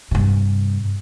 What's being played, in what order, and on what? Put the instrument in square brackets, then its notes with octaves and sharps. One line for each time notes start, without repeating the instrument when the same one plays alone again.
[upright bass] G2 C3